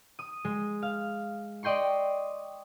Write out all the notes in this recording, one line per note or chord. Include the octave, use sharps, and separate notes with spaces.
D#6
G#3
F5
D5 D#5 G5 C6 C#6